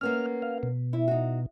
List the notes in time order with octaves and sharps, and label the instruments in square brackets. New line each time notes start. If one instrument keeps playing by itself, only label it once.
[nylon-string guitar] A#3 B3 C#4 [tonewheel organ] F6
[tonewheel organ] F5
B2
[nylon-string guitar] E4
D#4 F#4